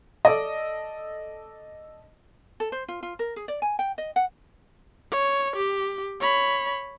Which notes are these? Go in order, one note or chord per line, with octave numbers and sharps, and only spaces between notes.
A4 D5 D#5
A4
C5
F4
F4
A#4
G#4
D5
G#5
G5
D#5
F#5
C#5
G4
C#5 B5